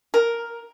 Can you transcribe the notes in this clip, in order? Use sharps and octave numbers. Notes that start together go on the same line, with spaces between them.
A#4